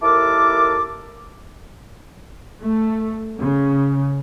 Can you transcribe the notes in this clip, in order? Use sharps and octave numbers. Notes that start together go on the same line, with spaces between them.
D#2 E4 A4 A#4 A5 D6
A3
C#3